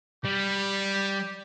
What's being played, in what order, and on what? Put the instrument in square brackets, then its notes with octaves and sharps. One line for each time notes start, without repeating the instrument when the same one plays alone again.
[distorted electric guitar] G3 [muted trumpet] G4